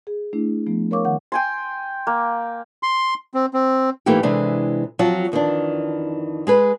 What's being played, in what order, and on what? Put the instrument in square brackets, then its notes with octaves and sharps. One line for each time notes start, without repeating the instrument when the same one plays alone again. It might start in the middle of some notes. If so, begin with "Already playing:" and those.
[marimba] G#4
A3 D4 E4
F3 A3 B3
A#4 C#5 F5 C#6 D6
D#3 F#5
[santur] G5 G#5 C6
A#3
[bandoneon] C6
C4
C4
[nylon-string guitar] G#2 E3 A3 A#3 D#4 G4
C3 E3 G#3 D4
F3 F#3 C4 F4
F2 D#3 E3 D4
G#3 G#4 B4